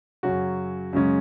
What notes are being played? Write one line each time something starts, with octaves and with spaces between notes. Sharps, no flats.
F#2 C#3 F#3 C#4 F#4
F#2 C#3 G#3 C#4